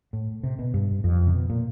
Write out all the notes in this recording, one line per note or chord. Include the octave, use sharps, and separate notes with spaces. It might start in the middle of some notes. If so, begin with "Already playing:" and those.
A2
C3
B2
G2
F2
C3
B2
A#2